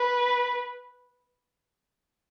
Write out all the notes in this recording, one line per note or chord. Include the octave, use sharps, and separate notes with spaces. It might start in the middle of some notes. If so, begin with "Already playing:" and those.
Already playing: B4